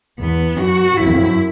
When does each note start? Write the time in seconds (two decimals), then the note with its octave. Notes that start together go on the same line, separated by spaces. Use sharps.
0.19 E2 B3
0.58 F#2 F#4
0.97 F#2 E4